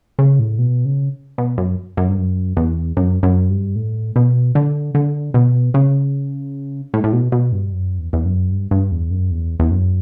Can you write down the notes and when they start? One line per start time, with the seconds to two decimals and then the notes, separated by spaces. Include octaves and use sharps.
0.19 C#3
0.39 A2
0.59 B2
0.85 C#3
1.38 B2
1.58 F#2
1.97 F#2
2.08 G2
2.18 F#2
2.57 E2
2.97 F#2
3.23 F#2
3.50 G2
3.76 A2
4.16 B2
4.55 D3
4.95 D3
5.34 B2
5.74 C#3
6.94 A2
7.04 A2
7.13 B2
7.32 B2
7.52 G2
7.72 F#2
7.99 E2
8.13 E2
8.25 F#2
8.51 G2
8.71 G2
8.92 E2
9.11 F#2
9.31 E2
9.60 E2
9.71 F#2